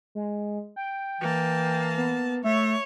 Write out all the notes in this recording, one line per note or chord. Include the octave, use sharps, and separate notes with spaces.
G#3
G5
E3 A#3 A5
B3
A3 C#5 E5